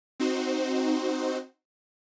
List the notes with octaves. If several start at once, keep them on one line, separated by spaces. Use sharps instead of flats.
C4 D#4 F#4 C5